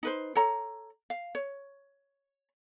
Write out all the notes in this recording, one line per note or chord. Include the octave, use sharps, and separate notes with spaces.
D#4 B4 C5
A4 C#5 A#5
F5
C#5